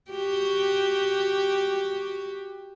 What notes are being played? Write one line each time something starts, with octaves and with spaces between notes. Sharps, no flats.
F#4 G4